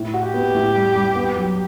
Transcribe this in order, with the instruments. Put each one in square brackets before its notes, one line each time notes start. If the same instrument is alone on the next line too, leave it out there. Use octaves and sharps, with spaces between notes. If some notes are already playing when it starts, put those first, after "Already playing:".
Already playing: [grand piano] A2
F#4
[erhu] G4
[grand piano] B3
A2
G3
G3
B3
F#3